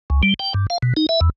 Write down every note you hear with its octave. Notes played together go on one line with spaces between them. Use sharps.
C#2
G3
G5
G2
F5
B2
D#4
E5
E2